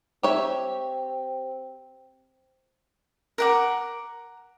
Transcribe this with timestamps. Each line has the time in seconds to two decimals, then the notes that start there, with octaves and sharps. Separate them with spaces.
0.23 C4 G4 C#5 E5
3.38 A#4 F#5 D6